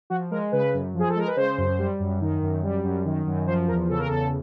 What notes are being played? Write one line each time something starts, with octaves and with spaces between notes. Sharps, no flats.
F3 F#4
G#3 A#4
C#3 B4
F#2
F3 G#4
A4
G#3 A#4
B4
C#3 C5
F#2
G3
F#2
D#3
F#2
G3
F#2
D#3
F#2
F3 C5
E2 A#4
C#3 A4
A#4
E2 A4